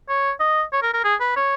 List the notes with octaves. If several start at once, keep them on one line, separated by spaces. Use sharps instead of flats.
C#5
D#5
C#5
A#4
A#4
G#4
B4
C#5